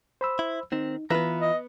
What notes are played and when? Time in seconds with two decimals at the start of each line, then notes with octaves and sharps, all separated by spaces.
0.21 C5 B5 E6
0.39 E4
0.72 D#3 C4 D#4
1.10 E3 B3 F4 B4 E5 A#5 B5
1.41 D#5